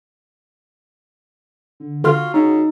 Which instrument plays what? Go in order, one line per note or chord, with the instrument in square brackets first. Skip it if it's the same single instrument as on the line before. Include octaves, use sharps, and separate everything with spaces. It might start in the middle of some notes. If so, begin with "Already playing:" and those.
[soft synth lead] D3
[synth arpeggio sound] D3 C6 F6 [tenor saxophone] F4 [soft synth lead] F#4
[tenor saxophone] C#3 [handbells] D#4